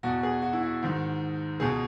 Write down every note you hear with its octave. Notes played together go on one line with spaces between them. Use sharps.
E2 B2 F#4
G#4
F#4
E4
F#4
G#2 D#3
C#2 B2 G#4